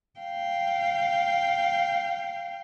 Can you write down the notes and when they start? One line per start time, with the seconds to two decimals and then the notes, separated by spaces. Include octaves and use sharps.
0.20 F5 G5